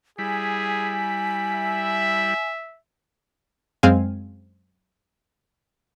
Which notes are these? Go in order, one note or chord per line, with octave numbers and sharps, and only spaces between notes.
G3 E4 G#4 G#5 B5
E5
F#2 G#3 C4 F5 G#5